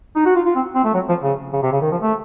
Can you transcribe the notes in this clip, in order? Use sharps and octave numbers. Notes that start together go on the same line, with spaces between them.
D#4
F#4
F4
F4
C4
C4
A3
F#3
F3
C#3
C#3
C3
C#3
D#3
F3
A3